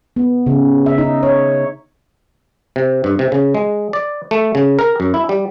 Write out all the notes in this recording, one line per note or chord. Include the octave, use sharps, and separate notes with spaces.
B3
C#3
E5
D#4
C#5
C3
G2
C3
C#3
G#3
D5
A3
C#3
A#4
F#2
E4
G3